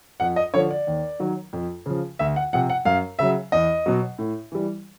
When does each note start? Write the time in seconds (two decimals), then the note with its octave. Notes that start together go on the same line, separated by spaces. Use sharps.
0.20 F2 F#5
0.36 D#5
0.54 D3 F3 C#5
0.71 D5
0.87 D#2
1.19 D#3 F#3
1.53 F2
1.86 C#3 F3
2.19 D2 E5
2.36 F#5
2.53 C3 F3 F#5
2.70 F#5
2.85 F#2 F5
3.19 C#3 F#3 E5
3.52 E2 D#5
3.86 B2 F#3
4.19 A2
4.52 E3 G3